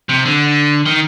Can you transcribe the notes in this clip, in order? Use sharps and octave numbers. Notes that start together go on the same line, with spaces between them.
C3
D3
D#3